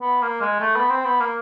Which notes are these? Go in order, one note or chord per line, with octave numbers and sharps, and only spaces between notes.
B3
A#3
G#3
A3
B3
C4
B3
A#3